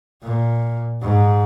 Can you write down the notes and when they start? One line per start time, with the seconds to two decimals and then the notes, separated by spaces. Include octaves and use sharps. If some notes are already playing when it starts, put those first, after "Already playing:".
0.22 A#2
1.02 G#2